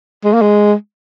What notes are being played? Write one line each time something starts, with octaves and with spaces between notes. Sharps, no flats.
G#3
A#3
G#3